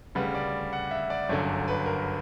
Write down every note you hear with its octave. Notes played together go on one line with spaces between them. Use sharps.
D2 C#3 G3 B4
D5
F#5
E5
D5
G1 F#2 D3 C#5
B4
A#4